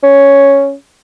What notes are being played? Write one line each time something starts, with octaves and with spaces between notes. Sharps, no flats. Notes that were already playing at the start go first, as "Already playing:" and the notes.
C#4